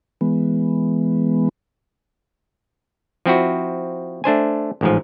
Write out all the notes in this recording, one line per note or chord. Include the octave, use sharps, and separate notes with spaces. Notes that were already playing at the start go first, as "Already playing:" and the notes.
E3 G#3 B3
F3 C4 E4 F#4
A3 D4 C5 G#5
A1 G#2 F3